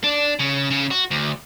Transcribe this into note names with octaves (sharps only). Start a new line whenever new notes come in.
D4
C#3
C#3
F#4
D2